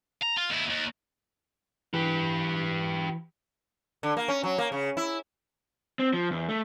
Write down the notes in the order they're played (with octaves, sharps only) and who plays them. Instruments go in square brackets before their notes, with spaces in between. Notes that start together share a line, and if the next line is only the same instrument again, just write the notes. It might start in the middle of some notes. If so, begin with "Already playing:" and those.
[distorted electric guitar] A#5
F4
D#2 E4
D#2
[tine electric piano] E3 [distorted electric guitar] G4 B4
[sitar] D3
A#3
C#4
F#3
A#3
C#3
E4
[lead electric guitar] C4
F3
E2
A3